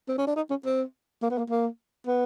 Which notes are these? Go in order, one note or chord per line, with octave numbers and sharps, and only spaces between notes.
C4
C#4
D4
D#4
C#4
C4
A#3
B3
A#3
A#3
B3